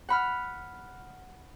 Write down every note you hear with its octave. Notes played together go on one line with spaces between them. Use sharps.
F#5 B5 F6